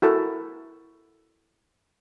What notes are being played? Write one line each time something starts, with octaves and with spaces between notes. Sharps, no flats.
E4 F#4 A4 A#4